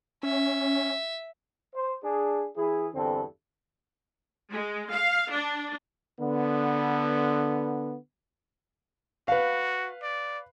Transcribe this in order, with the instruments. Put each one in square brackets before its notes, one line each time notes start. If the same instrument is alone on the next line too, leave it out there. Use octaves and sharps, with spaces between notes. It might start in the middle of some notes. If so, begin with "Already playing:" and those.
[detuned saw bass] C#4 [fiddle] E5
[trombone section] C5
D4 G#4
E3 E4 G#4
E2 G2 D3 C4 A4
[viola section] G#3
F5
D4
[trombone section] D3 B3
[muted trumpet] F#4 [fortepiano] B4 F5
[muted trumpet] D5